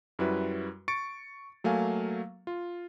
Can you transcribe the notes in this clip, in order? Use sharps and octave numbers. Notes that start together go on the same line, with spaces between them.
F#2 G3 E4 F#4 B4
C#6 A6 C#7 D7
F#3 A3 A#3 F5 G#5
F4